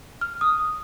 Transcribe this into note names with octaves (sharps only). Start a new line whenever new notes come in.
F6
D#6